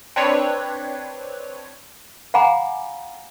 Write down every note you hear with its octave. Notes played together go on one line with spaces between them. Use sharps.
C4 D4 B4 C#5
F5 F#5 G#5 A#5 B5 D6